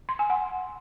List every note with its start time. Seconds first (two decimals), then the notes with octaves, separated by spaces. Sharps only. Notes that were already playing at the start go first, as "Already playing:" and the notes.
0.09 C6
0.19 G#5
0.30 F#5